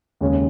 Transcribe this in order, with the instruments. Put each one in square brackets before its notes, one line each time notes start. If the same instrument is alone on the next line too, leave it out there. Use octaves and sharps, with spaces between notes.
[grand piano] D#2 C#3 G#3 C#4 G#4